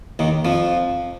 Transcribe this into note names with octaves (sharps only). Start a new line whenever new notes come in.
D#2 D#3
F2 F3